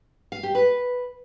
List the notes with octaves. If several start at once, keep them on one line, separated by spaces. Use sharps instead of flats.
F5
G4
B4